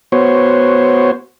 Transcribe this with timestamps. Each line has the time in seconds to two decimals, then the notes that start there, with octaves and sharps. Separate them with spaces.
0.12 B3 F#4 C5 C#5